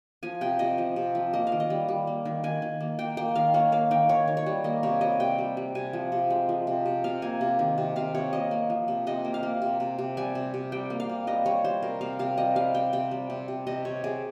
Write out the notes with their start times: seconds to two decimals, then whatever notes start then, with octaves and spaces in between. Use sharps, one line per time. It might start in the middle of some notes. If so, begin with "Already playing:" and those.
0.23 F3 G#5
0.41 C3 G5
0.59 C3 D#5
0.78 F3
0.96 C3
1.15 F3
1.33 A#3 D#5
1.47 F5
1.52 D#3
1.60 D#5
1.70 G3
1.89 G3
2.07 A#3
2.25 D#3
2.44 D#3 G#5
2.62 D#3
2.80 A#3
2.99 A#3 G5
3.17 A#3 G5
3.35 D#3 F5
3.54 A#3 C#5
3.72 A#3 F5
3.91 D#3 G5
4.09 D#3 C#5
4.28 D#3
4.37 C#5
4.46 G3
4.64 A#3 D#5
4.83 C3 C#5
5.01 G3 D#5
5.20 C3 G5
5.39 G3
5.57 G3
5.75 C3 G#5
5.93 F3
6.12 C3
6.30 G#3
6.49 F3
6.67 C3
6.86 C3
7.04 C3 F5
7.22 A#3 G#5
7.41 C3
7.59 D#3
7.78 C3
7.96 C3 F5
8.15 C3 C#5
8.33 A#3 D#5
8.51 A#3
8.70 F3
8.88 C3
9.07 C3 D#5
9.25 A#3
9.34 F5
9.43 A#3
9.62 C3
9.80 C3
9.98 C3
10.17 G3 G#5
10.35 C3
10.54 C3
10.72 G3 G5
10.90 A#3
11.00 F5
11.09 C3
11.27 G3 D#5
11.46 G3 C#5
11.64 G3 C5
11.83 C3 A#4
12.01 C3 F5
12.19 C3 F5
12.38 G3 D#5
12.56 G3 F5
12.74 C3 G5
12.93 C3 G5
13.11 G3
13.30 C3
13.48 C3
13.67 C3 D#5
13.85 C3 C#5
14.04 C3 G#4